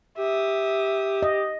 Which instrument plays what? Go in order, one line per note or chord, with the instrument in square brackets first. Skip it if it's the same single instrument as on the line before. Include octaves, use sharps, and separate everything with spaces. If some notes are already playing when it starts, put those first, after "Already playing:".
[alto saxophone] G4 [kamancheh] E5 D#6
[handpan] D#5